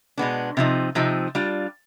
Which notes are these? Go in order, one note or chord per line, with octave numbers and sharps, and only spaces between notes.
B2 G#3 B3 D4
C3 F3 C4 D#4
C3 F3 C4 D#4
G3 D4 F4